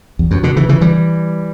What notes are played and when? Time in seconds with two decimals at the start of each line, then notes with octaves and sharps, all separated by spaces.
0.19 E2
0.31 F#2
0.43 B2 D3
0.56 C#3 E3
0.69 C#3 E3
0.81 E3 G3